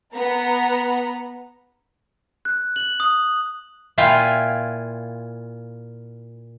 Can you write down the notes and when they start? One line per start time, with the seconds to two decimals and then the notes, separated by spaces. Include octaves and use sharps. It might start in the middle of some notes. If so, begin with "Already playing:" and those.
0.14 B3 A#5
2.45 F#6
2.76 F#7
3.00 D#6
3.98 A#2 E4 F4 F5 G5 G#5